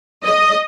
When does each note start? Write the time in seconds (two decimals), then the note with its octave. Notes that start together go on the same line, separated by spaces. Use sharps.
0.24 D#5